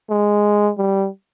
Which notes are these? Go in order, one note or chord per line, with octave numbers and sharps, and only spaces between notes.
G#3
G3